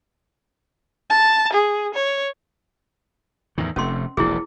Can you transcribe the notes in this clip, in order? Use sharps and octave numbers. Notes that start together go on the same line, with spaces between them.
A5
G#4
C#5
E2 A2 D#3
F1 C3 A3 C#4 C6
E1 A#1 A#2 E4 G#4